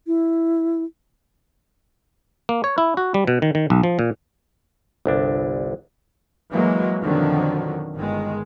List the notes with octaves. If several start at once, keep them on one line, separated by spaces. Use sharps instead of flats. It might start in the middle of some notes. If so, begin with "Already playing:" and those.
E4
A#3
C#5
E4
F#4
G3
B2
D#3
D#3
B1
F3
A#2
G1 C2 D4
E3 F#3 G#3 A#3
F2 B2 D3 D#3 F3 F#3
G1 D#3 G#3